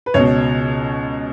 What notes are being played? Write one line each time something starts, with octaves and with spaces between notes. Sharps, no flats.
B4
C#2 B2 C#5